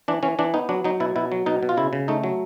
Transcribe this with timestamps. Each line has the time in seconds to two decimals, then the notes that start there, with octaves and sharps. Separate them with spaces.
0.08 E3 D4
0.23 E3 C#4
0.39 E3 D4
0.54 B3 D#4
0.69 F#3 D4
0.84 F#3 D#4
1.00 B2 E4
1.16 B2 E4
1.32 F#3
1.46 B2 D#4
1.63 B2
1.69 F4
1.77 C#3 E4
1.93 C#3
2.08 A3 D#4
2.24 F#3